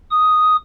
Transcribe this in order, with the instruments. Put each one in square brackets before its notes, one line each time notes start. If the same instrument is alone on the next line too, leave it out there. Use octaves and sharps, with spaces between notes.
[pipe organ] D#6